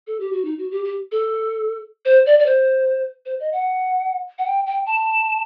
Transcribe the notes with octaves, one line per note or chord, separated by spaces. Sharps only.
A4
G4
F#4
D#4
F#4
G4
G4
A4
C5
D5
D5
C5
C5
D#5
F#5
F#5
G5
G5
A5